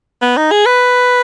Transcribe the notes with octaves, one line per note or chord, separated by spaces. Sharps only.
B3
D#4
G#4
B4